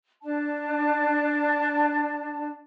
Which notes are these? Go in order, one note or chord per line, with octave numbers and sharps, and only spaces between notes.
D4 A5